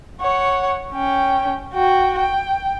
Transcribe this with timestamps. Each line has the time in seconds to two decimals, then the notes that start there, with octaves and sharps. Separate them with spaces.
0.21 C#5 F#5
0.93 C#4 G5
1.73 F#4 G5
2.18 G5